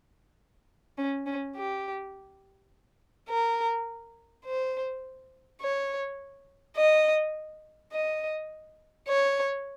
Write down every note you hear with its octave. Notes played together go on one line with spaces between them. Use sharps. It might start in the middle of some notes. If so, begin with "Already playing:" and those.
C#4
C#4
G4
A#4
C5
C#5
D#5
D#5
C#5